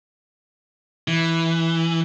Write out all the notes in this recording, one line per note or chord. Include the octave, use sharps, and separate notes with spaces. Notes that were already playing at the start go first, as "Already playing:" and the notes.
E3